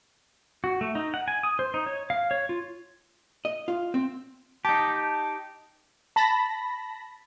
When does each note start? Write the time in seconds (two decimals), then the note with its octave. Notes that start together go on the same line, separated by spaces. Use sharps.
0.64 F#4
0.81 A3
0.95 D#4
1.14 F#5
1.28 G#5
1.43 D#6
1.59 C5
1.74 D#4
1.86 C#5
2.10 F5
2.31 C#5
2.49 F4
3.45 D#5
3.68 F4
3.94 C4
4.65 D#4 G4 A5
6.16 A5 B5 A#6